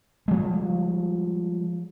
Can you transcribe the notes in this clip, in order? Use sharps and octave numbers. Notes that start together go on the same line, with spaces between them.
F3 G3 G#3